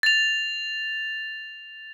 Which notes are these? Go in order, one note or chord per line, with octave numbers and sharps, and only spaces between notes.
A6 F7